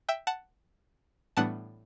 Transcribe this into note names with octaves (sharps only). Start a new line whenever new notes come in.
E5 G5
F#5 A5
A2 E3 G3 B3 D4 F#5 A5